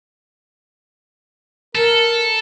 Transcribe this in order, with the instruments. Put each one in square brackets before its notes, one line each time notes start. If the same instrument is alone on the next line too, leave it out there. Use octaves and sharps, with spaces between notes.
[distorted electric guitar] A4 [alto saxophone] A#4